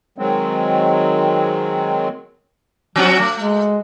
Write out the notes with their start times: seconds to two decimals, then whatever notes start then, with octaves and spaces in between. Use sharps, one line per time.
0.18 D#3 F#3 G#3 C4
2.96 F3 F#3 C4 F#4
3.18 A3
3.38 G#3